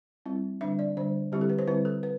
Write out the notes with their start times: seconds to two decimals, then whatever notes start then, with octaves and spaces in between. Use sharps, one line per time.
0.26 G3 C4 E4
0.61 D3 G3 D4 E5
0.79 D5
0.97 D3 G3 D4 C5
1.32 D3 G3 C4 E4 G4
1.41 A4
1.50 B4
1.59 C5
1.68 D3 G3 C4 E4 B4
1.85 A4
2.03 B4